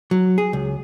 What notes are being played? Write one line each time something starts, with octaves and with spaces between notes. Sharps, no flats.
F#3
G#4
C#2